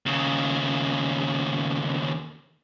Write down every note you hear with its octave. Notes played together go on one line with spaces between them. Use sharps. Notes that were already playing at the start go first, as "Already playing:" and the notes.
D#2 C#3